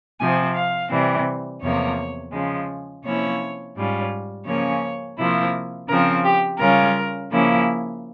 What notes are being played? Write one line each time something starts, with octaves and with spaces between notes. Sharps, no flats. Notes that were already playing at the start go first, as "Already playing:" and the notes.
C3 F3 C4 G#5
F5
C3 E3 G3 C4
E2 C3 F3 A#3 C#5
C#3 F3 G#3
C3 F3 A#3 C#4 E4 C#5
G#2 G3 C#4 F4
C#3 F3 A#3 C#4 C#5
C3 F3 A#3 E4
C#3 F3 C4 A#4
G4
C#3 G3 C#4 F4 A#4
C#3 F3 A#3 C#4 E4